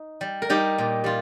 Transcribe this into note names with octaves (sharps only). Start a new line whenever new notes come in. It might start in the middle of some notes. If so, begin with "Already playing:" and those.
Already playing: D#4
G3
A#4
G3 D#4 G4
A#2
G3 F4